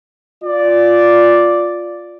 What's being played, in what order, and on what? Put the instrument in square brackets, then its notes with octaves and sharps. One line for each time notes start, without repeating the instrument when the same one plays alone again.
[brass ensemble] F4 D5